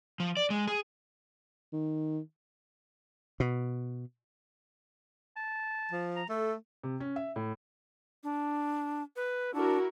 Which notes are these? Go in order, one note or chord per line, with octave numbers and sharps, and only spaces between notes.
F3
D5
G#3
G#4
D#3
B2
A5
F3
A#5
A3 A4
C3
C#4
E5
A2
D4
B4
D4 E4 F#4 A#4